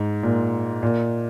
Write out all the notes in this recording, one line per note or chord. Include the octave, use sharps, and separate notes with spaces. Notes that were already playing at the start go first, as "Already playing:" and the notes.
Already playing: G#2
A#2
A#2